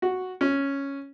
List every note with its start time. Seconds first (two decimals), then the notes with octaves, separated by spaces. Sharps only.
0.02 F#4
0.41 C#4